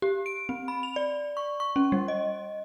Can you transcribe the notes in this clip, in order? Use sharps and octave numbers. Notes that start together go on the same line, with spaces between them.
G4
D7
C4
B5
F7
D5
C#6
C#6
C#4
G3
D#5